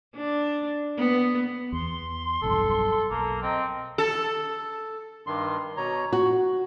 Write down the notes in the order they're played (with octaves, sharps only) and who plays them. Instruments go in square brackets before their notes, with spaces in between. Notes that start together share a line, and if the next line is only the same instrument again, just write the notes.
[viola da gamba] D4
B3
[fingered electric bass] E2 [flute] C6
[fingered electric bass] F1 B1 G2 [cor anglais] A4
[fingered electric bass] B1 [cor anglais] A#3
[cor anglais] C4 [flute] D#5
[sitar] A4
[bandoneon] G2 D#3 C6
B2 C#5 A#5
[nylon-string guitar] F#4